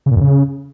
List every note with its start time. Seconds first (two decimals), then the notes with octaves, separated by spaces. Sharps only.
0.06 C#3
0.11 A#2
0.16 F2
0.21 C#3